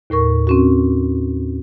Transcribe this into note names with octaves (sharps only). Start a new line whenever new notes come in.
D#2 A2 A#4 C#6
C4 C#4 F#4